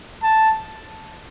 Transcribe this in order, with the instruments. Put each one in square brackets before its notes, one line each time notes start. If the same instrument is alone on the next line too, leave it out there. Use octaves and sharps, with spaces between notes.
[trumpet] A5